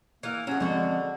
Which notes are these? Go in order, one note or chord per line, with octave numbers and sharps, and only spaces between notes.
E3 A#3 F5
F#3 C#4 G#4
F2 D3 G#3 F#4